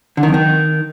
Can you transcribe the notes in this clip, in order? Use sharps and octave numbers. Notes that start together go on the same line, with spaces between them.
D3
D#3
F2
D#3